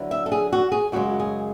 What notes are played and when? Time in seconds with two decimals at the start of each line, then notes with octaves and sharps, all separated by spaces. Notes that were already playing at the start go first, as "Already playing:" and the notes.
Already playing: D3 F#3 B3 E4
0.11 E5
0.26 A4
0.32 G#4
0.52 F#4
0.72 G#4
0.92 F#2 C#3 G#3 F#4
1.20 G#4